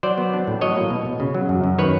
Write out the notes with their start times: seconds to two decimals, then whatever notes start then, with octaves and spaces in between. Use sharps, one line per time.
0.03 F#3 C5 D5
0.18 B3
0.33 D4
0.47 A2
0.61 F#3 C#5 D#5
0.76 A#3
0.90 B2
1.06 B2
1.20 C#3
1.35 F#3
1.49 F#2
1.64 F#2
1.79 D#3 B4 C#5